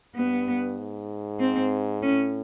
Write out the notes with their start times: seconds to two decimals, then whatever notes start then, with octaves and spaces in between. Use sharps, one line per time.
0.15 G2 B3
0.78 G#2
1.40 C4
2.02 A2 C#4